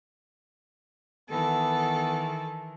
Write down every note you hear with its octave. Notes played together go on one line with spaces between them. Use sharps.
D#3 E3 B3 A4